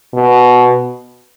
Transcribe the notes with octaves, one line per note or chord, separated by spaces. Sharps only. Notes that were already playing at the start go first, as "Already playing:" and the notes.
B2